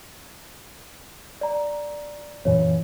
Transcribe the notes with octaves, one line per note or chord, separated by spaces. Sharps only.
D5 A#5
F#2 A#2 E3 C#5